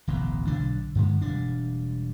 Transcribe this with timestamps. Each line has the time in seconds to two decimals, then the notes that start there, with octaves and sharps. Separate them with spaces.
0.08 D1 A1 B2
0.47 B1 D3 D4
0.95 G2 D3 G#3
1.21 E1 G3 D4